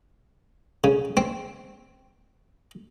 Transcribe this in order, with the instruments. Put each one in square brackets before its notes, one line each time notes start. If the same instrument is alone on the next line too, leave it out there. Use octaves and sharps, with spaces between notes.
[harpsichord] C#3
C4